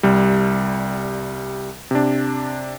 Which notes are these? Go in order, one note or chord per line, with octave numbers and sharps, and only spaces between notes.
C2 G3
C3 D4